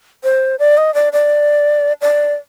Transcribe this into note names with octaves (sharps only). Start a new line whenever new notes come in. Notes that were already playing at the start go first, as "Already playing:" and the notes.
C5
D5
D#5
D5
D5
D5